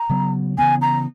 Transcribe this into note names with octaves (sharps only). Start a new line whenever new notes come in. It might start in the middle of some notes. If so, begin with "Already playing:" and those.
Already playing: A#5
C#3 F#3 B3
C#3 E3 B3 G#5
A#5